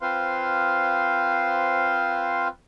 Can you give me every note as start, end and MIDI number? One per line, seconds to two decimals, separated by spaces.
0.01 2.48 60
0.01 2.48 65
0.01 2.48 71
0.01 2.48 72
0.01 2.48 77
0.01 2.48 84